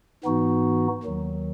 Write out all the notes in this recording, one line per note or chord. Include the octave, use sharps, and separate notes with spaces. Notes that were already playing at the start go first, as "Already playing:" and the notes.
G#2 E3 B3 D#4 F#4
D#2 D#3 F#3